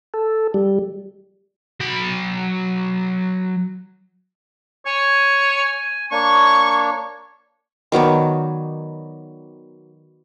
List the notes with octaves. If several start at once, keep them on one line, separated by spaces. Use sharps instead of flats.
A4
G3
F#3 B5
C#5 G#5
A#3 D4 C#5 C#6
D#3 F#3 B3 D5